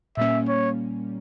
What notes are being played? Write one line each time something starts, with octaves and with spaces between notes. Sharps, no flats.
A#2 G3 A#3 C#4 E5
C#5